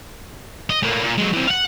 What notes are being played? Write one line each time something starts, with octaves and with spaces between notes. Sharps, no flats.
D#5
A2 A#3
A#2
F#3 G#3
E3 C4
F5 F#5